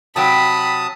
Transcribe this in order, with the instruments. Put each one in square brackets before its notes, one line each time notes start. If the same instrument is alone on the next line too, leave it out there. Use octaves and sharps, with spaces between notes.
[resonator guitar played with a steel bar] C3 F#3 G5 [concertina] A5 D#6 [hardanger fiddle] B5